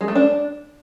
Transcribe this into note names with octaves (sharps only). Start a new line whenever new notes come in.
G#3
A3
D4